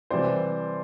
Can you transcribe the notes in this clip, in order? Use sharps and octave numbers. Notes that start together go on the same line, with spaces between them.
C2 C3 E3 G3 C5 D5